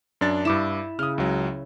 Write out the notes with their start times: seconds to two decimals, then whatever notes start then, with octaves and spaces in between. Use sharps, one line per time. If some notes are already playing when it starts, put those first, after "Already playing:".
0.21 F#2 D4 A6
0.45 G2 E4 D6 E7
0.99 C#3 D#6 F6
1.18 C#2 F#3